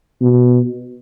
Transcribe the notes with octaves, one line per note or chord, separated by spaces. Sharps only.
B2